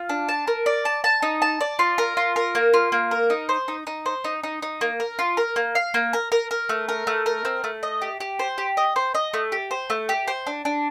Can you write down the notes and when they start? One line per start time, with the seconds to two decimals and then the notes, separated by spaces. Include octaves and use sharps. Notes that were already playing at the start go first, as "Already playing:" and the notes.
Already playing: F4
0.09 D4
0.29 A5
0.47 A#4
0.66 D5
0.85 A5
1.04 A5
1.22 D#4
1.42 A5
1.61 D5
1.79 F4
1.98 A#4
2.17 F4
2.36 A#4
2.55 A#3
2.74 F4
2.92 A#3
3.11 A#4
3.30 D#4
3.49 C5
3.68 D#4
3.87 D#4
4.06 C5
4.24 D#4
4.43 D#4
4.62 D#4
4.81 A#3
5.00 A#4
5.19 F4
5.37 A#4
5.56 A#3
5.75 F5
5.94 A#3
6.13 A#4
6.32 A#4
6.51 A#4
6.69 A3
6.89 A#4
7.07 A3
7.26 A#4
7.45 C4
7.64 A3
7.83 D#5
8.02 G4
8.20 G4
8.39 C5
8.58 G4
8.77 D#5
8.96 C5
9.15 D#5
9.33 A3
9.52 G4
9.71 C5
9.90 A3
10.09 G4
10.28 C5
10.47 D4
10.65 D4